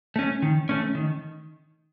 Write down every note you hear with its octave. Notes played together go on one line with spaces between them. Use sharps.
A3 C#4
D#3
A3 C#4
D#3